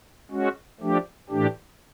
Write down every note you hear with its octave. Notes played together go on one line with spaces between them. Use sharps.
G#3 C#4 F#4
F3 A3 D4 G4
A2 E3 A3 D4 G4